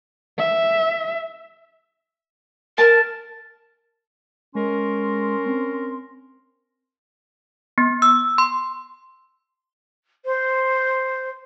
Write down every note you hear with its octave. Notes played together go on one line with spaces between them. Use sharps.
E5
A#4 A5
G#3 C#4 A#4 C6
C4
B3
E6
C6
C5